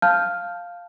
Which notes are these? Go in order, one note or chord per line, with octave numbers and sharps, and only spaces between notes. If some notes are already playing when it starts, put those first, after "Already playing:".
F5 A5 F6 G6